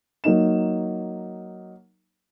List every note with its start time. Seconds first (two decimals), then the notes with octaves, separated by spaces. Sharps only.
0.24 F#3 A#3 D#4 E7